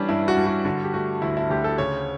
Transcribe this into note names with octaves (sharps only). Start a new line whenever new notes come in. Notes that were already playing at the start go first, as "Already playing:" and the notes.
Already playing: E3 G3 C#4 D4
G2 E4
F#4
G2
F#4
D3 F#4
G4
A3 F#4
D2 E4
E4
D2 G4
A4
C#3 C#5